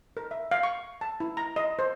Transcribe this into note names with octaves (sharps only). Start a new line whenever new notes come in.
A#4
E5
F5
C#6
A5
E4
A#5
D#5
C5